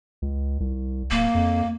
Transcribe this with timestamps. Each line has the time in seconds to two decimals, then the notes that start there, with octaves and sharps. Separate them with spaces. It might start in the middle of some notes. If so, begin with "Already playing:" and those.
0.22 C#2
0.60 C2
1.11 D1 A#3
1.35 F2